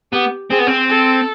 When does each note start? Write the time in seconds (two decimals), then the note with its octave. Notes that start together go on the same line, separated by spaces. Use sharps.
0.12 B3 G4
0.50 C4 G#4
0.58 B3
0.67 C4
0.89 A4